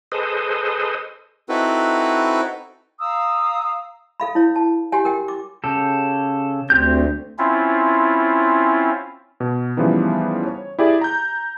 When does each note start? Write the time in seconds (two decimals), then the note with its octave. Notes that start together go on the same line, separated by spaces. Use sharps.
0.12 G#4 A4 B4 C5 D#5
1.49 C4 D#4 E4 F#4 A4 B4
3.00 F5 A#5 D#6 E6
4.20 A4 F5 B5
4.35 E4 C#5
4.56 A5
4.92 F#4 G4 C#5 F#5 G#5
5.05 A#4 G5
5.28 D6
5.64 C#3 G4 A4
6.70 D2 C4 G4 G6
7.38 C4 C#4 E4 F4
9.40 B2
9.77 C#3 E3 F3 G3 B3 D#4
10.46 C#5
10.79 E4 G4 G#4 D5
11.01 A#5 G6